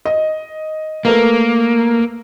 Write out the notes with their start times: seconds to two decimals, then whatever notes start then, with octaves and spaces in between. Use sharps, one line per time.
0.05 D#5
1.05 A3 A#3 A#4 B4